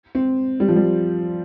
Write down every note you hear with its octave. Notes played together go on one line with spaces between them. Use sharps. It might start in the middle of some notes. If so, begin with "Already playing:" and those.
C4
G3
F3
G3